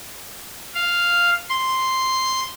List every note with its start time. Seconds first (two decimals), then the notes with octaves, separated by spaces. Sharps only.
0.75 F5
1.49 C6